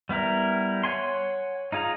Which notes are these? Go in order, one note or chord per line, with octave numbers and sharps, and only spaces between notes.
G3 B3 E4 A#4
C#5 F#5 G#5 C6
D#4 F4 G#4 A#5